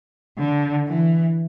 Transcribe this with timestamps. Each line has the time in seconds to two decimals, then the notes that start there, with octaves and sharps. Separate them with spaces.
0.39 D3
0.88 E3